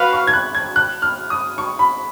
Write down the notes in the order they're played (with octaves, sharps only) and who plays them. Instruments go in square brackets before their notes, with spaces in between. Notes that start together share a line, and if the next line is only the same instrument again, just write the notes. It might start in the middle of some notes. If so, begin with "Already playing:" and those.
Already playing: [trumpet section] F#4 B4 F5 [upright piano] B5
[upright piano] C#6
G#6
F#6
G#6
F#6
F6
D#6
C#6
B5